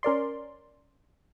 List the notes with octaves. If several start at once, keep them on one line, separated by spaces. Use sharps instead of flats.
C#4 A#4 D5 C6